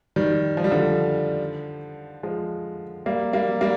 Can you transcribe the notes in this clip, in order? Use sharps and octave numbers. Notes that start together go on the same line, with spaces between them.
D#3 G3
F3
G3
D3 F3
F3 G#3
G3 A#3
G3 A#3
G3 A#3